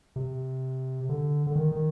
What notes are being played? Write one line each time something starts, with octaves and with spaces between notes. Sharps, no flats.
C3
D3
D3
D#3
D#3